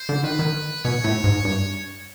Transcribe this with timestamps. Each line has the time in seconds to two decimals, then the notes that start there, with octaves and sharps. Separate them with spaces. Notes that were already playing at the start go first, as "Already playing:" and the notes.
Already playing: C5
0.09 D3
0.24 D#3 B4
0.39 D#3
0.85 B2 C#5
1.04 A2
1.24 G#2
1.45 G2